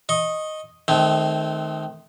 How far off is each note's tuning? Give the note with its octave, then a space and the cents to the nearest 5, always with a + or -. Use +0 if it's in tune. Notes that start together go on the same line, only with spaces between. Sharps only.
D#5 +0 C#6 -25
D#3 -5 A3 -35 C4 +0